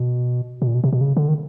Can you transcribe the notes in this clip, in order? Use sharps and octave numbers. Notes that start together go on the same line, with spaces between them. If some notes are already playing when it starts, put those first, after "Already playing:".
Already playing: B2
B2
A#2
B2
C3
B2
C#3
D3
D#3